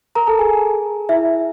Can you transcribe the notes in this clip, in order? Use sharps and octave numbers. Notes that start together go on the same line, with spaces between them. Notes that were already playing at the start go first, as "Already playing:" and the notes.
A#4 A#5
A4 A5
G#4 G#5
E4 E5